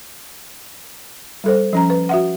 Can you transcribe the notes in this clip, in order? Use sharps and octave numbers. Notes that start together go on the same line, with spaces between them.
G3 A4 C5
F3 C#4 A#5
B4
F#4 E5 F#5